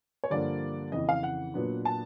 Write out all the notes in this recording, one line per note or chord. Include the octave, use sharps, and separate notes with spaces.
C#5
G2 D3 F3 A#3 D5
F2 C#3 E3 D#5
F5
F#5
A#2 F#3 B3 D4
A5